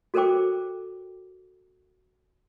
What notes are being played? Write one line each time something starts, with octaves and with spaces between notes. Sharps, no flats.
F#4 A4 A#4 C5 G5 D6